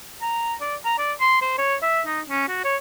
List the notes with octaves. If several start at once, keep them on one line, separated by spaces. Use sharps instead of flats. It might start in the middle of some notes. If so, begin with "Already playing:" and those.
A#5
D5
A#5
D5
C6
C5
C#5
E5
D#4
C#4
F#4
C#5